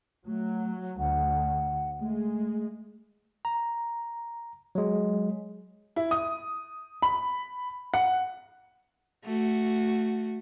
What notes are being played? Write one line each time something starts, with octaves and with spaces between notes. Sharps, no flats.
F#3 A3
D2 F#5
G#3 A3
A#5
F#3 G#3
E4
D#6
B5
F#5
A3 F#4